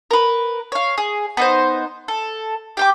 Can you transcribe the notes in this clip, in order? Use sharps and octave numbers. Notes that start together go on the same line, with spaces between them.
A#4 B4
C#5 F5
G#4
B3 D#4 C5
A4
G4 G5 D6